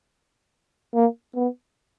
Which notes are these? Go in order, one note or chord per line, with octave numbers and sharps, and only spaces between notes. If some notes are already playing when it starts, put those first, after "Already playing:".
A#3
B3